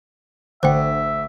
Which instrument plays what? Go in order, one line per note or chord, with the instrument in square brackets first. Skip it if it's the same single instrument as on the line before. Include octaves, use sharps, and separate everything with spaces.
[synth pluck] A1 D3 F#5 [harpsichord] D2 [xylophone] C5 G5 [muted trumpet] E5